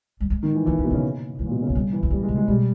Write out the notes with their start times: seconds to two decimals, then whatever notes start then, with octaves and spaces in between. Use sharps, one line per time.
0.20 G3
0.30 G#3
0.43 D#3
0.55 E3
0.66 E3 A#3
0.78 B3
0.84 B2
0.90 C#3 A#3
1.39 E3 G#3
1.46 A#2
1.51 B2
1.62 C#3
1.69 G#3
1.75 G3
1.92 E3
2.03 B3
2.10 G3 A#3
2.23 G#3
2.29 C#3
2.36 G#3
2.47 B2 G3